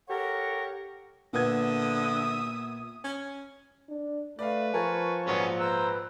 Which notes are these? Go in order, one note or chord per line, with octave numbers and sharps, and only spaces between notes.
G4 A4 A#4 C#5 F#5
A#2 D3 B3 E5 D#6 G#6
C#4
D4
A3 B4 D5 F5
F3 A#4 G#5 A5 C#6
A#1 G#2 F#3 B3 C#4
B4 C5 A#5 E6